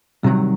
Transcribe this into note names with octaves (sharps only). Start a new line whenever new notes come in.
C3 D#3 F#3 G3